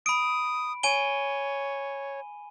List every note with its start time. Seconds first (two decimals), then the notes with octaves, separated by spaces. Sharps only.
0.06 B5 D#6 D7
0.83 C#5 G#5 D#7 G7